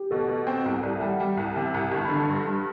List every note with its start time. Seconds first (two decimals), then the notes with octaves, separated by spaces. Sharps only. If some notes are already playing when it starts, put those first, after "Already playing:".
Already playing: G4
0.11 B2 A4
0.28 B2
0.47 C4
0.65 C2
0.83 C2 D5
0.95 E5
1.01 G3
1.07 F#5
1.20 G3
1.37 C2
1.56 C3
1.74 C2
1.92 G1 A5
2.04 B5
2.09 D3
2.16 A5
2.28 G2
2.45 G2